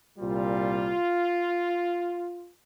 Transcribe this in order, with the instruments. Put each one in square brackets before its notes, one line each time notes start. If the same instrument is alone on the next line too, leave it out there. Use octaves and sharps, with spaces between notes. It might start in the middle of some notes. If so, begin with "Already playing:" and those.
[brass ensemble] C2 A#2 G3 F4